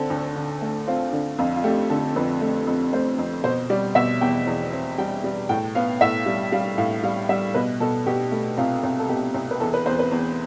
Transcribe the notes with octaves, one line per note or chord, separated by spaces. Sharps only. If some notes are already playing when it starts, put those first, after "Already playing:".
Already playing: D3 C4 A4
D2
D3
A3
C4 F4
D3
F2 F4
F4
A3 G4
D3 A4
F2 B4
A3
F2
A3 C5
F2
B2 C5
G3 D5
B2 E5
E2 G5
E2
C4
G3 G5
G3
A2 G5
B3 F5
A2 E5
G3
G3 F5
A2 F5
G3 F5
G3 E5
B2 B4
B2 A4
B2 G4
A3
C2 F4
C2
A4
B2 G4
C2
B4
E2 A4
B4
E2 C5
B4
E2